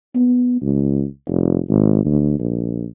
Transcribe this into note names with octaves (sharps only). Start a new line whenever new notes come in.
B3
C#2
F1
G#1
D2
A#1